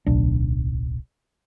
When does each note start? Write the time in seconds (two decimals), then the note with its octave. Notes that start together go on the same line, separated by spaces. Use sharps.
0.06 D1 B1 D4